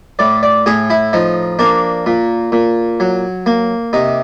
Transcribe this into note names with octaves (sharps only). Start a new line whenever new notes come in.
A2 D5
D5
A2 G#4
E4
F3 D#4
A#3 D4
A#2
A#2
F#3
A#3
C3 D#4